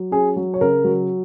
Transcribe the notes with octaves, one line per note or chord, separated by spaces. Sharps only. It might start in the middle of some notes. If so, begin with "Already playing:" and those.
Already playing: F#3
C#4 G#4
F#3
C#5
C#3 A#4
F#3